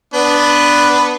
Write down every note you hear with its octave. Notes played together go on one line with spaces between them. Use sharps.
B3 D4 B4